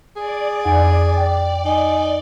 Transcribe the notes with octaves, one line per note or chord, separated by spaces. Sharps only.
G#4 D5
F2 F#5 G#5
G5
D#4 G#5